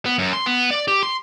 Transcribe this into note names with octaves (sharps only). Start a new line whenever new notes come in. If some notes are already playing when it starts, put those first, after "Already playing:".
B3
F#2
C6
B3
D5
G4
C6